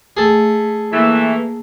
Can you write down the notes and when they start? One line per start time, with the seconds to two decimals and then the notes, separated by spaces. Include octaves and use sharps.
0.17 A3 G#4 A4
0.92 E3 A3 A#3